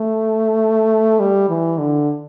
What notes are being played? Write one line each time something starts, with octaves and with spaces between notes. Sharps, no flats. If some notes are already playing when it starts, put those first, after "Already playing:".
Already playing: A3
G3
E3
D3